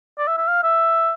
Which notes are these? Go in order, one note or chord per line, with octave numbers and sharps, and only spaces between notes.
D5
E5
E5
F5
E5